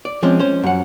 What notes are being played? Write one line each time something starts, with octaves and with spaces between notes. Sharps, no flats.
D5
F3 G#3 C4 C#4
C#4 C5
F#2 F#5